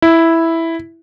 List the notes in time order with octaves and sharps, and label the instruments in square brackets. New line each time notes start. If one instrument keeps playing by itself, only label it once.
[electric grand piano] E4